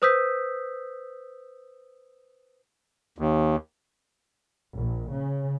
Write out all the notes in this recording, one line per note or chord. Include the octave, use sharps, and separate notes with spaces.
B4 C5 D#6 E6 G6 B6
D#2
A#1
C#3